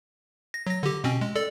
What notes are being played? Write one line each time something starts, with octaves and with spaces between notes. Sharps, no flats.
A#6
F#3 A#6
D3 G4
B2 C4 C#4
G#3
A4 D5